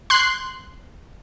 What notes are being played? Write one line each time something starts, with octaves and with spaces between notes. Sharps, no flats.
C6 F#6